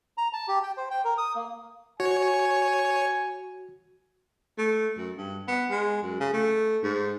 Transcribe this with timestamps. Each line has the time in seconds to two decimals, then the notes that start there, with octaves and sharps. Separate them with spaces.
0.18 A#5
0.33 A5
0.48 G4
0.63 G5
0.77 C5
0.91 G5
1.05 A#4
1.18 D#6
1.36 A#3
2.00 F#4 C#5 G#5
4.58 A3
4.97 F#2
5.17 G2
5.48 B3
5.71 G#3
6.03 F#2
6.20 C#3
6.33 A3
6.83 G#2